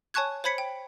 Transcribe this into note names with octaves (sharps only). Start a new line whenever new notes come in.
C#5 G#5 A5 C#6 F#6 G#6
C5 C#5 B5 G#6 B6 C#7
G5